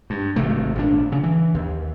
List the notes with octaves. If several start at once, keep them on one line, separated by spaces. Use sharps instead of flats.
G2
G#1 C3 A3
G#1 A#2 D4
C#3
E3
D#2